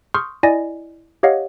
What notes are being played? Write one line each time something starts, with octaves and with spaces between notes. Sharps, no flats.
C6 C#6 D#6 F6 G6
E4 D5 D#5 G#5 A#6
G4 C#5 D#5 F5 F#5